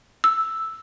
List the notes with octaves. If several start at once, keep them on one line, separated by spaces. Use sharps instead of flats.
E6